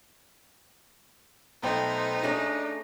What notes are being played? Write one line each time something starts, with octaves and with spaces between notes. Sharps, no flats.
B1 A3 B3 D#4 C5 G5 C6
A3 C#4 D4 G#4 A#6